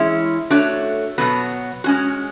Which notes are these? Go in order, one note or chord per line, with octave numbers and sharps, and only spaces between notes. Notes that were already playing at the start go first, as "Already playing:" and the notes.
Already playing: E3 G#3 C#4 E4
A3 D4 F#4 C#5
B2 F#3 B3 F#4
G#3 C#4 F#4